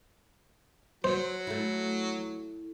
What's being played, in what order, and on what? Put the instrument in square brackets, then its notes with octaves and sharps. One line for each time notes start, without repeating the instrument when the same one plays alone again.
[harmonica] F#3 [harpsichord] C5
[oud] A3 E4